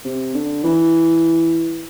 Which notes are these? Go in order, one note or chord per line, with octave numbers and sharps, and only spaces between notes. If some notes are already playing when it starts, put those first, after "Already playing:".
C3
D3
E3